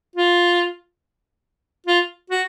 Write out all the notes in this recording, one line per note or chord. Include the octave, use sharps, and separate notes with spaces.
F4
F4
F#4